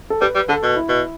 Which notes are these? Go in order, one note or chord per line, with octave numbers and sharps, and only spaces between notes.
A4
G3 B4
G3
D3 A4
B2
E4
B2